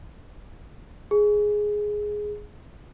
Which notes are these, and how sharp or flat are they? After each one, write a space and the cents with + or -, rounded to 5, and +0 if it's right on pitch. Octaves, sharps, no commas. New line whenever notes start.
G#4 +5